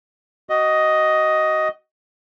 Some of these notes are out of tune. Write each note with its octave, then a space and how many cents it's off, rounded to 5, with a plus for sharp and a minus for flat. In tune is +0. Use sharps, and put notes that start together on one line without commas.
F#4 +20 D#5 +5